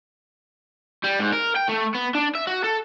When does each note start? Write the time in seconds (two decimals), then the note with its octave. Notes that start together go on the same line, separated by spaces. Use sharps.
1.04 G3
1.19 G#2
1.33 A#4
1.56 G5
1.70 A3
1.95 B3
2.15 D4
2.35 E5
2.47 F#4
2.64 A4